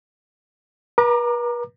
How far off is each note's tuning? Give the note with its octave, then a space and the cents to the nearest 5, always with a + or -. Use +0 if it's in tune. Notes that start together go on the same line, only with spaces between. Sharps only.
B4 -45 A#5 +0 D6 +30